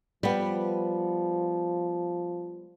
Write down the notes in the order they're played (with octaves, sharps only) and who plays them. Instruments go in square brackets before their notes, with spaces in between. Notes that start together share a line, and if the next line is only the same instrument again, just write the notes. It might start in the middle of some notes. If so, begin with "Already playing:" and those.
[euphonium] F3 [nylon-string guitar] G3 B3